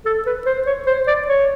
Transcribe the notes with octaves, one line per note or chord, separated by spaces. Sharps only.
A4
B4
C5
C#5
C5
D5
C#5